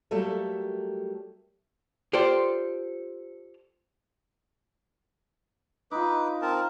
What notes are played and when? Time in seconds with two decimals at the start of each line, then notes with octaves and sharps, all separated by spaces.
0.11 F#3 G3 A3 A#3 A4 E5
2.13 F4 G4 A4 C5 D5
5.91 D#4 F4 B4 D6
6.42 C4 A#4 A5